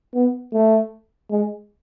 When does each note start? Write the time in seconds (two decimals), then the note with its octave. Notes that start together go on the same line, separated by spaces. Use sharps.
0.14 B3
0.53 A3
1.31 G#3